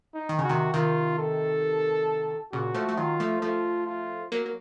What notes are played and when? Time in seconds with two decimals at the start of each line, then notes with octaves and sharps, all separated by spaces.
0.14 D#4
0.29 D#3
0.39 C#3
0.44 F#4
0.49 C3 D#3
0.73 C3 D#3 F4
1.18 A4
2.53 A#2 C#3 F#4
2.74 F3 A3
2.89 A3
2.97 D#3 F#3 F4
3.20 F3 A3
3.42 F3 A3 F4
3.86 F4
4.32 F#3 A#3
4.46 A#3